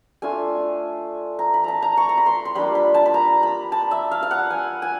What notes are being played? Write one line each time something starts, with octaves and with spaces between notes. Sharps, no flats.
A3 D4 F4 G#5
A#5
B5
A5 A#5
A#5
C#6
A#5
B5
C6
C6
G3 A#3 D4 F4 B5
B5
A5
B5
A#5
B5
A5
E5
F5
F5
F#5
G#5
G#5